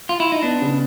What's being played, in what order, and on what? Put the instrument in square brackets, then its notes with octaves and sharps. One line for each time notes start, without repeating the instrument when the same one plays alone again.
[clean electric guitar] F4
E4
D#4
[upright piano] B3 [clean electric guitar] D4
[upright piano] C#3